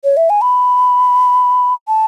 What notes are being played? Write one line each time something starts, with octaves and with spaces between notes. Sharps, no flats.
C#5
E5
G#5
B5
A5